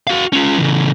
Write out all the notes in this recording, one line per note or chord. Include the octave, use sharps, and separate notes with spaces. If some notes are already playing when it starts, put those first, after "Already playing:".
F#4 F5
C#4 F4
C#3 E3